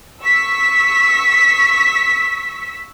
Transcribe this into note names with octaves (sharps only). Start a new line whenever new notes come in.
C#6 E6 B6